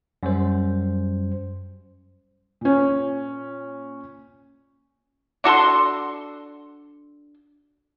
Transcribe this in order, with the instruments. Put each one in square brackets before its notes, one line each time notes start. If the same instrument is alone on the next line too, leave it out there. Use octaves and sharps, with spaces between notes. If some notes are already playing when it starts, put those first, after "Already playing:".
[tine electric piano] F#2 G3 C5
[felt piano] A#2 C#4
[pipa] D4 F#4 A4 C6